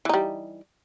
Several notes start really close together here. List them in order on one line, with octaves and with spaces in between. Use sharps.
E3 D#4 G3